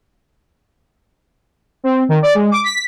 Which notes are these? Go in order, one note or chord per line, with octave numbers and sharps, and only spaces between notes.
C4
D#3
D5
G#3
D6
B6